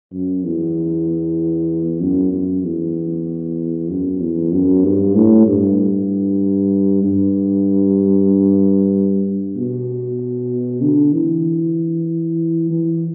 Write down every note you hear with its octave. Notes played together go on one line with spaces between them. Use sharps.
F#2
E2
F#2
F#2
E2
F#2
E2
F#2
G2
A2
G2
G2
B2
D3
E3
E3